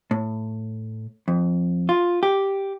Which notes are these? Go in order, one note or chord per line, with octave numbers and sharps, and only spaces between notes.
A2
F2
F4
G4